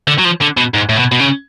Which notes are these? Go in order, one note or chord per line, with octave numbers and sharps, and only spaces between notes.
D3
F#3
F3
D3
B2
G#2
A2
B2
B2
C#3